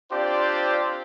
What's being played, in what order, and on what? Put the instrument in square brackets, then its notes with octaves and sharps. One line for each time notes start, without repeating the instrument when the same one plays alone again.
[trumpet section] C4 D4 F4 G4 C5 D5